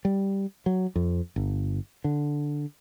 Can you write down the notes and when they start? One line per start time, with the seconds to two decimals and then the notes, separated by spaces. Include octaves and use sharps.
0.05 G3
0.66 F#3
0.96 F2
1.36 G1
2.04 D3